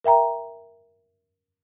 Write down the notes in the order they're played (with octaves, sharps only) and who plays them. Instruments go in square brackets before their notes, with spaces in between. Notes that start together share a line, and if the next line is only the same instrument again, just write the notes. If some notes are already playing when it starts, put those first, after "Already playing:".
[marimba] A#4 E5 G5 A#5